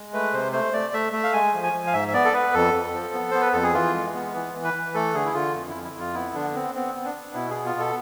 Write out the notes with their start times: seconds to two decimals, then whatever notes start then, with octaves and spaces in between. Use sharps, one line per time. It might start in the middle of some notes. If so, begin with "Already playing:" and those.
Already playing: G#3
0.13 A3 B4
0.33 C3 C5
0.53 A3 C5
0.73 A3 D5
0.93 A3 E5
1.13 A3 E5
1.24 F5
1.33 G#3 G#5
1.54 F3
1.63 G#5
1.73 F3
1.87 F5
1.93 G#2 E5
2.08 E5
2.13 B3 D5
2.25 A4
2.33 B3 B4
2.54 F2 A4
2.74 F2
2.94 F3
3.14 B3
3.31 B3 C5
3.42 B4
3.53 F2 A4
3.63 G#4
3.74 E3 F4
3.94 G#3
4.14 B3
4.34 E3
4.54 E3
4.64 B4
4.74 E3
4.94 A3 A4
5.14 D3 G#4
5.25 E4
5.34 D3 F4
5.55 F2
5.69 E4
5.75 F2
5.84 E4
5.94 F2
6.00 F4
6.14 B3 E4
6.34 D3 D4
6.55 B3 C4
6.75 B3 C4
6.95 B3
7.05 D4
7.15 B3
7.34 B2 E4
7.50 G#4
7.55 B3
7.66 F4
7.75 B2 A4